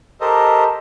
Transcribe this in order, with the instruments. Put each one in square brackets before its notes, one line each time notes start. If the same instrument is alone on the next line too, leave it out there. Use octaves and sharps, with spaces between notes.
[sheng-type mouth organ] G4 A4 A#4 C5 D#5